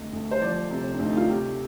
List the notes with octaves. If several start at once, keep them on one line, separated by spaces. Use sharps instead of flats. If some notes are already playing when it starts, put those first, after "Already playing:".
Already playing: D2 C3 D#5
D2
C5
F3 D5
C3
C4
D2 D4
D#4
F4
C3 G4